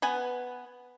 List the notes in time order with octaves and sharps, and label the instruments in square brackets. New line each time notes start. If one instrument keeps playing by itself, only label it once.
[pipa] B3 B4 G#5